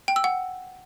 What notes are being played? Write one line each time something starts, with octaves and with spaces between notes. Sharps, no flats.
G5
E6
F#5